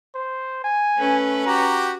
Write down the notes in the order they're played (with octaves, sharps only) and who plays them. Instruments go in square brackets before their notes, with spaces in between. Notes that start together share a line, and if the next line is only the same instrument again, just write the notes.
[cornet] C5
G#5
[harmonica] A3 [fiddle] C#4 B4
[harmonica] F#4 G4 [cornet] A#5